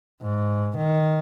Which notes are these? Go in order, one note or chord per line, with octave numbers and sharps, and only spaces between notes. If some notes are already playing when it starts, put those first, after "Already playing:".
G#2
D#3